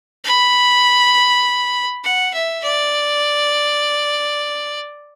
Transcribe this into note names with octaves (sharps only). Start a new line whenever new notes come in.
B5
F#5
E5
D5